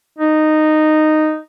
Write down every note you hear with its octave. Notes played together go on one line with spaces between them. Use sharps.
D#4